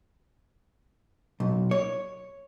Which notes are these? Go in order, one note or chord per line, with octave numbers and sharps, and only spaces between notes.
B1
C#5